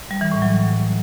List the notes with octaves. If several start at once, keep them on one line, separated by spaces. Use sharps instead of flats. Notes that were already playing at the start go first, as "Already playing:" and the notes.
G3
E3
A2
F#3